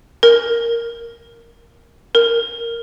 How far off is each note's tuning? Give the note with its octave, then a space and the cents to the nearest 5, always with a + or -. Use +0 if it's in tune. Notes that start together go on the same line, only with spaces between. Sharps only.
A#4 +0
A#4 -5